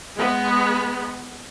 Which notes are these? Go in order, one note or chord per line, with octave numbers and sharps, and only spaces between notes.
G#3 B3